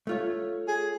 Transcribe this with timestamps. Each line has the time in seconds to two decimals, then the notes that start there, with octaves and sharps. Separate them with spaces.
0.07 A3 F4 C#5
0.68 G#4